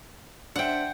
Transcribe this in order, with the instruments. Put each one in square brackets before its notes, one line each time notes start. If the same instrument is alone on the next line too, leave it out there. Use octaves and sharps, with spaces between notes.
[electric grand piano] D4 C5 E5 [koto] F#5 G5